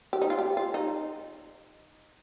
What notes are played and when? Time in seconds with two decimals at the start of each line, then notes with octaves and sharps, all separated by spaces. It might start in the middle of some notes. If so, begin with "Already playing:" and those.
0.13 G4
0.22 D#4
0.30 F4
0.39 G4
0.57 F4
0.74 D#4